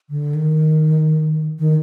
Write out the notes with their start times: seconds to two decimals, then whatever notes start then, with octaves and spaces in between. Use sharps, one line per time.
0.10 D3
0.35 D#3
1.59 D#3